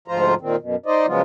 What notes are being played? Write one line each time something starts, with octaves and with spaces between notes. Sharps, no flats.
D2 G#2 F3 F4 C5 A#5
A#2 D#3 C4
F#2 B2
D#4 C5 D5 D#5
C#3 F3 F#3 G#3 B3 F4